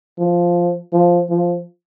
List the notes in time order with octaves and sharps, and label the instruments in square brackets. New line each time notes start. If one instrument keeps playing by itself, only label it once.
[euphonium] F3
F3
F3